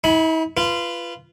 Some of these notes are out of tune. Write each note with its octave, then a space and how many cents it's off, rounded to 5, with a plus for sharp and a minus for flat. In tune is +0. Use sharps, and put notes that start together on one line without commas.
E4 -45 G#5 +5 B5 +0
F4 -20 B4 +0